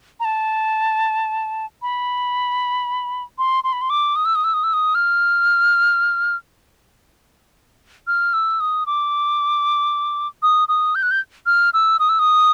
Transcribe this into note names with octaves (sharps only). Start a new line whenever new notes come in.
A#5
A5
B5
C6
C6
B5
C6
D6
D#6
E6
D#6
E6
D#6
E6
D#6
F6
F6
E6
D#6
D6
D#6
D#6
G6
F#6
G6
F6
E6
D#6
E6
D#6